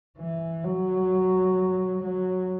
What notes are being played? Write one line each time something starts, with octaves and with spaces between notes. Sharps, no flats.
E3
F#3
F#3